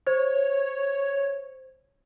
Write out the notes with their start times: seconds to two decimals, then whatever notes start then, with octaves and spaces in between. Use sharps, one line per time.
0.07 C5 C#5